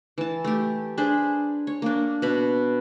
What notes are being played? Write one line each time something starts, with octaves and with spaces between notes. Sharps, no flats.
E3 A5
A3 G4
D4 G#4 C5 B5
C#5
A#3 D4
B2 B5